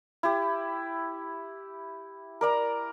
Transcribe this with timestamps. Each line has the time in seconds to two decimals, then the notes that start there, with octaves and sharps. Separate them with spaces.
0.23 E4 G4
2.41 A#4 D5 A#5